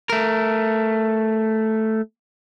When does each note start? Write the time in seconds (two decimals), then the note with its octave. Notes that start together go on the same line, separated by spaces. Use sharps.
0.10 A3 A#4